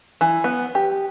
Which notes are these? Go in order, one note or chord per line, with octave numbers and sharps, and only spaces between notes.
E3
B3
G4